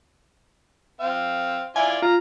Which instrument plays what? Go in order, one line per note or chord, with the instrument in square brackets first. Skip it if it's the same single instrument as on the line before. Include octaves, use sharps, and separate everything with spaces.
[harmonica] C4 F5
[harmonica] E4 F4 D5 [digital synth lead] G#5
[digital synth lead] F4 [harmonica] A#5